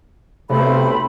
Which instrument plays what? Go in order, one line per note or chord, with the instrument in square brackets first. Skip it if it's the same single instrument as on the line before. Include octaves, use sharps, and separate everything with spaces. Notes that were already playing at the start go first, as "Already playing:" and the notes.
[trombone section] B1 [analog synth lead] C3 [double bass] A3 C4 [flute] B5